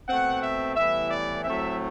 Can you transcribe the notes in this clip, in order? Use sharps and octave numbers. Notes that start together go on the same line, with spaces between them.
B2 A3 C4 F#5
E5
A2 E3 G3 B3 E5
D5
A2 F#3 A3 C4 E5